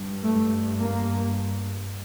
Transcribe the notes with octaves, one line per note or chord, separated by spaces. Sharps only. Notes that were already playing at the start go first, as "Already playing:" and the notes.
Already playing: G2
A3
A#3